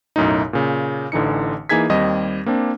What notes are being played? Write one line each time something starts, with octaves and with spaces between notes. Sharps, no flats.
B1 F#2 A2 D#4
A#2 C#3
A1 D3 E3 D#4 C#7
E3 A#3 D#4 G#4 G#6 B6
D#2 G3 C4 D#5
A#3 C4 D4